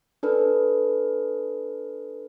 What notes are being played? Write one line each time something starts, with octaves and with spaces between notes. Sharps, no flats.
D4 A4 B4